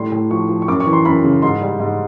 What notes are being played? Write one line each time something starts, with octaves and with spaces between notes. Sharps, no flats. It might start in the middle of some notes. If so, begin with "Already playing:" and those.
Already playing: A2 G3 C6
A2
F3 C#6
F3
C#6
F#2 D6
C#6
E3
C6
F#2 B5
C#3
G#2 C6
G3
G#2